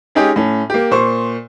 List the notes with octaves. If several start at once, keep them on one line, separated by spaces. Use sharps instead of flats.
G#3 C#4 D#4 G4 G#4
A2 C#4
A#3 G4
A#2 C5 C#6